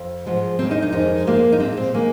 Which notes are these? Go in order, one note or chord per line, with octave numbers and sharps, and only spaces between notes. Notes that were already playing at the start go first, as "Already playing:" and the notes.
Already playing: F2
G#2 F3 G#3
D#2 D#3 G#3 C4
D#4
D#4
F2 D#3 G#3 D#4
F2 F3 G#3 A#3
D#4
A#2 G#3 C4
D#4
C4
D#3 G#3 A#3